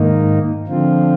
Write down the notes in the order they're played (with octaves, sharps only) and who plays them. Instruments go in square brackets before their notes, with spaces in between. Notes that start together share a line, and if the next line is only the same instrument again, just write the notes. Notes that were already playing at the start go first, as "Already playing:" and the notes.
Already playing: [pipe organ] G#2 D#3 A#3 D#4
D3 F3 C4 F4